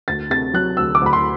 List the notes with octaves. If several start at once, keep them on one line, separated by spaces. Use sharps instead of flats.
D2 A6
C3 A6
F#3 F#6
D2 E6
D6
D2 B5
C6